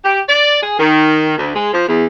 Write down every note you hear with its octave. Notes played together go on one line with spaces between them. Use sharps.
G4
D5
G#4
D#3
D2
G#3
F3
E2